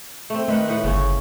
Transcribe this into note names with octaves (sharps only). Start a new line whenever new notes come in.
A3 C4
D#3 A3 B4 F#5
A2 B4 F#5
G1 C#3 C#4